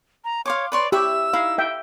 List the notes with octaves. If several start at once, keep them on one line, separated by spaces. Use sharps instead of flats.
A#5
C#5 F5 C6 D6
B4 C#5 D5 C6
E4 G4 C#5 E5 E6
D#4 E4 F5
E5 G5